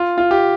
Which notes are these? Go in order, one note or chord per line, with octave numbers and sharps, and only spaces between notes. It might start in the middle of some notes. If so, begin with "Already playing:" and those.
Already playing: F4
F4
G4